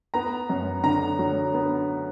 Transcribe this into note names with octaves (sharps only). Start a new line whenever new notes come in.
B3 A#5
F#2
D3 A#5
F#3
B3